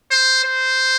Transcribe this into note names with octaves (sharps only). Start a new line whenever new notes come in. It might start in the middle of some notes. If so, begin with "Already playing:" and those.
C5
C5